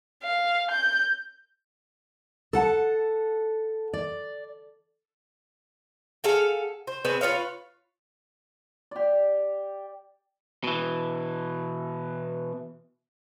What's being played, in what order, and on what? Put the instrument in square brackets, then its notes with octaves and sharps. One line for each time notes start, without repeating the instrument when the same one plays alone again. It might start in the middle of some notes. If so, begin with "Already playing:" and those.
[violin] F5
G6
[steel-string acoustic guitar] A4 F#5 A5
D5
[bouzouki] G#4 A4 F5 F#5
C5
B3 C4 G#4 B4
F4 B4 C#5 F5
[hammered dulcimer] G4 D5
[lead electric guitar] B2 E3